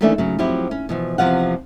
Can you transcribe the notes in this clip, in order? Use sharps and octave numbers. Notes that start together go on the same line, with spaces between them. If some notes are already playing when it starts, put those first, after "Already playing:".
D#2 E3 A3 C#4 D4 E5
C#3 F#3
F3 F#3 C4 E4 G4
C#4
B2 E3 F3
E2 C3 E3 F3 F5 F#5